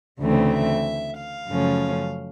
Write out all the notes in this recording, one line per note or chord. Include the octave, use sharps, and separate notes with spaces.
D2 C#3 E3 A3 C4
E5
F5
F#2 C#3 F3 A3 C#4